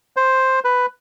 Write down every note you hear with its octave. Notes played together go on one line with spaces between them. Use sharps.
C5
B4